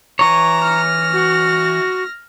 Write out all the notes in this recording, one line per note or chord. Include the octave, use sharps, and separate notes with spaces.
E3 C#5 A#5
F6 A#6
F#4